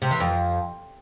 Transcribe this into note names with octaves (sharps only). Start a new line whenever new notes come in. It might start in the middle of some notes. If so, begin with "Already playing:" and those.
C3
E3
F2